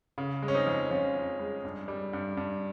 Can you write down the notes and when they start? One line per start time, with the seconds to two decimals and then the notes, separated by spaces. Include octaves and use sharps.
0.18 C#3
0.42 G#3
0.48 C#4
0.54 C4 D#4
0.67 F2
0.91 F2 C#4 F4
1.15 F2
1.40 G#3
1.64 G2
1.88 G3
2.13 G2
2.37 G2